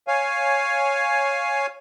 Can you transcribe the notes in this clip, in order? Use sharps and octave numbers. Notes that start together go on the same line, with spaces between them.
C#5 F5 G#5